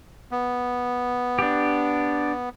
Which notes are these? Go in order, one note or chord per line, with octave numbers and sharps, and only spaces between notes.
B3
D4 G4